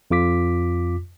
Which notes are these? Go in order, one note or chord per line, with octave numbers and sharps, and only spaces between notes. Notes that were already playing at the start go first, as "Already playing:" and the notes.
F2 F4 D6 B6